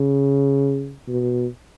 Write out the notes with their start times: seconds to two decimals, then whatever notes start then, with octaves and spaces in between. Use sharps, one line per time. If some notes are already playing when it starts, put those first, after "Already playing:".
Already playing: C#3
1.08 B2